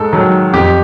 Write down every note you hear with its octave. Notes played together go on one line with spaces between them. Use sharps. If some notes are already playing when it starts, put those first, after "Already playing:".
Already playing: G#2 A4
D#3 F#3
F2 G4